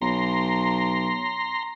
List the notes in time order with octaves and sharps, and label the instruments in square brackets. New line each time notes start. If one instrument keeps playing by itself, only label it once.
[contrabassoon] B1 [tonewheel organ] A#5 C6